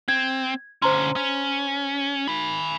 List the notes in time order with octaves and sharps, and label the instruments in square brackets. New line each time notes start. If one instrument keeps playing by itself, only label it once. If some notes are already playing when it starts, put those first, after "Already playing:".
[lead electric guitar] C4 [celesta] G#6
[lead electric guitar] D3 C#4 [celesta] C5 A#5 C6
[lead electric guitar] C#4
G#5 B5